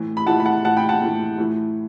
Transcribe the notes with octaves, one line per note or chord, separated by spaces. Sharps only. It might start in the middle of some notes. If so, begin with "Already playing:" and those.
Already playing: A2 E3
B5
A2 E3 F#5 A5
B5
F#5 A5
A2 E3 F#5 A5
G5 B5
F#5 A5
A2 E3
A2 E3